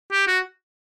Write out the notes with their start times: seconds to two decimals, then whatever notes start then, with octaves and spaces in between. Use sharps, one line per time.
0.12 G4
0.28 F#4